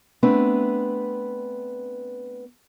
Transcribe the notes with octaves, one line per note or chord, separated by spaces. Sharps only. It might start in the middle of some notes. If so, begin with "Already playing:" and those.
A3 B3 C4 D4 B4